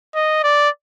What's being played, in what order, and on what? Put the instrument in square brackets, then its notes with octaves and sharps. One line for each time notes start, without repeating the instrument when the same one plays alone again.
[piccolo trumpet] D#5
D5